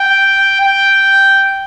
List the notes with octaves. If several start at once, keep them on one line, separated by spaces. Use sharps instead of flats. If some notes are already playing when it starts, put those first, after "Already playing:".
Already playing: G5
G5